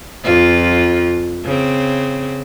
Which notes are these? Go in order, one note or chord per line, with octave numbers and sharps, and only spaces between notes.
F2 F4
C#3 C4